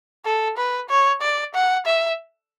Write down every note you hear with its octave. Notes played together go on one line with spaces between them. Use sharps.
A4
B4
C#5
D5
F#5
E5